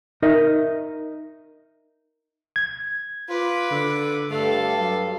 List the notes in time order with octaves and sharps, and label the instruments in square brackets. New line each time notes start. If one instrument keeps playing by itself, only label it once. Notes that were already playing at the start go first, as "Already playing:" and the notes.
[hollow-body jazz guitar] D#4 A#4 D#5 E5
[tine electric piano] G#6
[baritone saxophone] F4 [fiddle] B4 D6
[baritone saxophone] D3
[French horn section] G2 [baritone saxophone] A3 [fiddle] A4 F5
[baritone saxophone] F#3